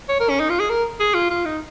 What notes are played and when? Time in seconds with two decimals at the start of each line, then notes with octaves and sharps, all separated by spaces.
0.09 C#5
0.20 A#4
0.30 C#4
0.40 D#4
0.50 F4
0.60 G#4
0.70 A#4
1.00 G#4
1.14 F4
1.30 F4
1.45 D#4